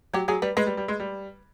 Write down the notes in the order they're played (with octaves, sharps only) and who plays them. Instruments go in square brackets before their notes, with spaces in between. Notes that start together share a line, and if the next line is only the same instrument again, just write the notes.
[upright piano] F#3 [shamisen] G4
[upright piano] F#3 [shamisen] G#4
[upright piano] G3 [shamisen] B4
[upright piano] G#3 [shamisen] B4
[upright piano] G3
G3
G#3
G3